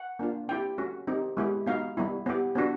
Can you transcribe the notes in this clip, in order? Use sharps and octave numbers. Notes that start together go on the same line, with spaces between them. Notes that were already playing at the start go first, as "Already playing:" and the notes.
Already playing: F#5
A#3 D4 F4
C4 E4 G4 G5
A3 C#4 F#4
C4 D#4 G4
G#3 B3 E4 G4
B3 D#4 F#4 F5
G3 B3 E4
B3 E4 G4
B3 D4 F#4